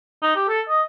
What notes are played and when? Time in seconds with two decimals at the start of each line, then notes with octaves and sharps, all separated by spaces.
0.22 D#4
0.35 G4
0.48 A4
0.69 D#5